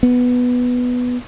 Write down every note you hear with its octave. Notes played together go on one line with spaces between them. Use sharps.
B3